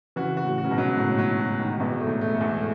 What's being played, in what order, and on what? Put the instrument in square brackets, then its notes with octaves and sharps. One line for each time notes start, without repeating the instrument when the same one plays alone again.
[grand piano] C#3 E3 [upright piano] F#4
[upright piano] F#4
[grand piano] A2
[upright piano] F#4
[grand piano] C#3
G#2 B2
[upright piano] F#3
[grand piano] A2 [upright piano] F#4
[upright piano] F#3
F#4
D#3
[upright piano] E2 [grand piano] G#2 B2
[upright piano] A3
[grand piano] A2
[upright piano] A3
[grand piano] G#2
[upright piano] E2